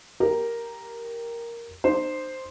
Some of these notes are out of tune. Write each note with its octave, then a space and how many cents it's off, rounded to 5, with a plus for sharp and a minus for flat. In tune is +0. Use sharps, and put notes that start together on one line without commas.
G4 +0 A#4 +0
D#4 -40 C5 +0